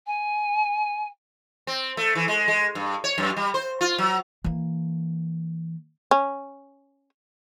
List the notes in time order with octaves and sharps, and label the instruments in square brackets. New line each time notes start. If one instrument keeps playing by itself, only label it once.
[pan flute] G#5
[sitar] C4
A3
E3
G#3
G#3
G2
C#5
F#2
G3
C5
F4
F#3
[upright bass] E3 A#3
[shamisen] C#4